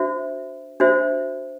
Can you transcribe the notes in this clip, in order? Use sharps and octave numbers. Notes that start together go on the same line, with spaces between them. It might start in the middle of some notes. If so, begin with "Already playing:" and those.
Already playing: D4 F#4 C5 E5
D4 F#4 C5 E5